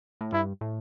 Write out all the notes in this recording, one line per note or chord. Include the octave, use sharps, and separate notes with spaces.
A2
G2 E4
A2